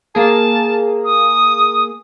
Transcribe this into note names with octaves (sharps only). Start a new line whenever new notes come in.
A#3 G#4 A5
D#6